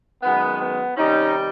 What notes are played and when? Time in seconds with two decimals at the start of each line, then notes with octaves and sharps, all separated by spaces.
0.23 F#2 D#3 G#3 B3
0.61 B3
0.97 C3 D#3 G3 C#4 D#4